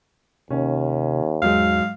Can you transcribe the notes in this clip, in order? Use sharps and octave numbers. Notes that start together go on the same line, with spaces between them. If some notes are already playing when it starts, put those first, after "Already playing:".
D#2 C3 C#4
E2 G#2 F#3 G#3 F5